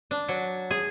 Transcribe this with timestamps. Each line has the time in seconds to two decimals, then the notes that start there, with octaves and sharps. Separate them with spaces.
0.11 D4
0.28 F#3
0.71 G#4